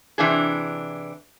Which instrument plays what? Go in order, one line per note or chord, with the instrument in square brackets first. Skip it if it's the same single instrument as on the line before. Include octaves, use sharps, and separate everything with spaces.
[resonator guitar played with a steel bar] C3 E3 D4 G#4